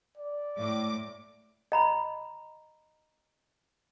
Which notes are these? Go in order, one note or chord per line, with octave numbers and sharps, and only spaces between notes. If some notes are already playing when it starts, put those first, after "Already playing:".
D5
A2 D6
D#5 A#5 B5